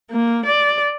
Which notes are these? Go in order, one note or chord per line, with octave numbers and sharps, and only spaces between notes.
A#3
D5